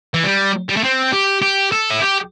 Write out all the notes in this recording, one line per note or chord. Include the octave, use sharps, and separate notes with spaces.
E3
G3
G3
A3
C4
G4
G4
A4
E4
G4